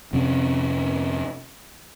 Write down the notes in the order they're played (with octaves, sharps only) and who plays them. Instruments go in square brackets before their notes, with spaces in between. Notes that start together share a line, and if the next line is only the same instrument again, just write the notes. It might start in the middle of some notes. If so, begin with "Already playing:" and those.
[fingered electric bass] F2 C3 C4 C#4